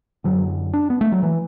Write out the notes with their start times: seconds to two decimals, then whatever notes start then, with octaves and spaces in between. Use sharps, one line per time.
0.24 F#2 D3 F#3
0.73 D4
0.90 B3
1.01 A3
1.12 F#3
1.23 E3